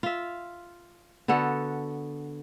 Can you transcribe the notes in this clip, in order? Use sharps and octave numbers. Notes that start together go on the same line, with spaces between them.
F4 E5
D3 B3 F#4 A4